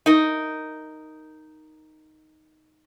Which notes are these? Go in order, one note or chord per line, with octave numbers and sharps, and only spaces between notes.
D#4 A#4